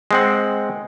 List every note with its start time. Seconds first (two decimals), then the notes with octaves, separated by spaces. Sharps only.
0.11 G#3 C4 F#5